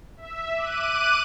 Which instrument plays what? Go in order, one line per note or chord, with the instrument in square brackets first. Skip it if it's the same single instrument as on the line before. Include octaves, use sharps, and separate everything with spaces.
[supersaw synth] E5
D6 F#6 D#7